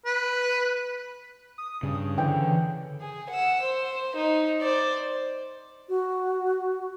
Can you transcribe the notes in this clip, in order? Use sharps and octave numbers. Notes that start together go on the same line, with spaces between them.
B4
D#6
G2 C#3
D3 E3 G5
G#4
F#5 E6
C5
D#4
C5 D5
F#4